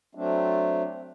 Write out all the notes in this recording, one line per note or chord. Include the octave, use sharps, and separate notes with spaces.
F#3 A3 C4 D4